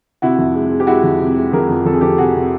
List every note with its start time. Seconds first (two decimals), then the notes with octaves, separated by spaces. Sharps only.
0.22 C3 E4 F#4
0.38 F2
0.55 G#3
0.71 G#3
0.80 G4
0.87 G#3 E4 F#4
1.03 F2
1.20 C3
1.36 G#3
1.53 F3 G#4 A#4
1.69 F2
1.85 F2 A4
1.93 G#4
2.01 F3 G4 A4
2.18 C3 F#4 G#4
2.35 C3